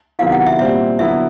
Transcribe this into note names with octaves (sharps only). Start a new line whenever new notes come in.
C3 D#3 F#3 B3 E4 F5
F#5
E5
A#2 G3 C4 E5
D3 F#3 B3 E4 E5